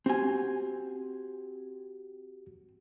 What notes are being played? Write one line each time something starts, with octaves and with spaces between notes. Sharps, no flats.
C4 F#4 G4 G#5